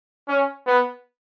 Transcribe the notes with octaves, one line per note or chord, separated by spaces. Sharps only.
C#4
B3